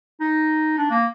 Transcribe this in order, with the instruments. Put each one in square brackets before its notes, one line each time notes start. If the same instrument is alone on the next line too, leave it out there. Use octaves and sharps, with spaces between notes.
[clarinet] D#4
D4
A#3